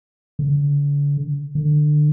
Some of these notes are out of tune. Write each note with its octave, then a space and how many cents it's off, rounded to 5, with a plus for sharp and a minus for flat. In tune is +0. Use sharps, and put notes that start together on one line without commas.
D3 -40
D3 +25